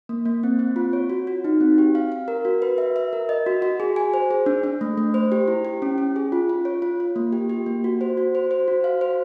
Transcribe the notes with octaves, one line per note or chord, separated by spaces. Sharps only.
A#3
A#3
C4
C4
F4
C#5
F#4
F#4
D#4
C4
G4
F5
F5
A#4
F#4
B4
E5
E5
A#4
D#5
F#4
F#4
G#4
G#5
C5
G#4
D4
D4
A3
A3
C5
G4
E4
G4
C#4
C#4
G#4
F4
F4
C#5
F4
F4
A#3
G4
G4
A#3
F#4
C5
F#4
C5
C5
F#4
F5
C5